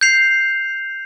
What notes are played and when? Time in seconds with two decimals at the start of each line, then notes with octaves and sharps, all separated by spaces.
0.01 G6 C7 F7